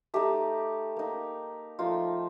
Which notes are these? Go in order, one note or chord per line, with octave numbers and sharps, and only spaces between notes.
A3 D#4 G4
A#3 D#4
F3 A3 D#4 F4